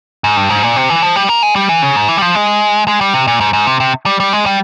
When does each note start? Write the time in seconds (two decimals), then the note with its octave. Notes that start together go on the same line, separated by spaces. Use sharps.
0.24 G#2
0.37 G2
0.49 G#2
0.63 A#2
0.76 C3
0.90 E3
1.03 F3
1.16 G3
1.29 A#3
1.42 G#3
1.56 G3
1.69 E3
1.82 C#3
1.96 G#2
2.09 E3
2.17 G3
2.22 F3
2.35 G#3
2.88 G#3
3.01 G3
3.14 C3
3.27 A#2
3.41 G#2
3.53 G#2
3.67 C3
3.80 C3
4.06 G3
4.20 G3
4.33 G#3
4.46 G3